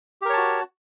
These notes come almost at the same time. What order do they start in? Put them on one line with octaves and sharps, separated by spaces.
G4 A#4 C#5 A5 F#4